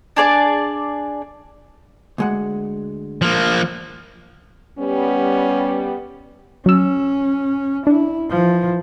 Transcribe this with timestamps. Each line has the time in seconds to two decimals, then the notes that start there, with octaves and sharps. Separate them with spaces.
0.16 D4 G#4 D5 A5
2.18 D2 G#3 F#5
3.22 F3 A#3
4.78 G3 B3 C#4
6.66 F#3 C#4 E6
7.87 D4 E4
8.30 E3 F3